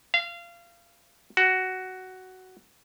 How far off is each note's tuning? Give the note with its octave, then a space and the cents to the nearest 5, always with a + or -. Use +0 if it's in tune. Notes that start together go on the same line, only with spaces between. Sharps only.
F5 -25
F#4 +10